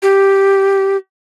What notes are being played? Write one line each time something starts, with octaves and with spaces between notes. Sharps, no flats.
G4